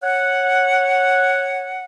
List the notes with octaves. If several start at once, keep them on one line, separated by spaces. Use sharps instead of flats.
C#5 F#5